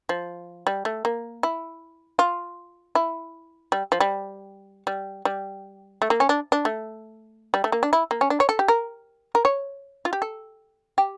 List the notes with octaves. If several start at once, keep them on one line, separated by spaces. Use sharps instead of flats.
F3
G3
A3
A#3
E4
F4
E4
G3
F3
G3
G3
G3
A3
A#3
C#4
D4
D4
A3
G3
A3
A#3
D4
E4
A#3
C#4
D4
C#5
A4
G4
A#4
A#4
C#5
F4
G4
A4
G4